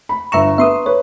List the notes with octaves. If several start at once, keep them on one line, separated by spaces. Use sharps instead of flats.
B5
G1 E5 A#5 C#6 E7
B3 B4 E5 C6 D#6
B4 C#5